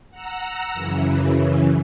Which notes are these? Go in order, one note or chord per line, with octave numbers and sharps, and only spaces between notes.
F#5 A#5 E6
F#2 C#3 E3